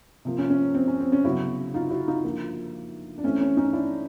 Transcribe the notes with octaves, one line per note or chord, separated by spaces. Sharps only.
C3 F3 A#3
C#4
C#4
C4
C#4
C4
C#4
C#3 F#3 B3 E4 F#4
D#4 F4
E4 F#4
D#4 F4
D3 F3 A#3
D4
E3 A3 C4 C#4
C#4
C#4 D#4
D4 E4